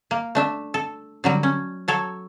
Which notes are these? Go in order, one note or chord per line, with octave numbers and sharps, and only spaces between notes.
A#3
A3 D4 E5
A4
D3 F#3 G3
C#4
F#3 A4 C#5